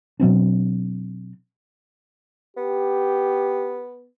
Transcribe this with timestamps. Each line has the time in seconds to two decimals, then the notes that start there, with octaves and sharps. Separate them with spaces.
0.20 B2 F#3 C4 D4
2.57 B3 G4